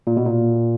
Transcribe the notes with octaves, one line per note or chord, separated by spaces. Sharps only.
A#2
B2
A#2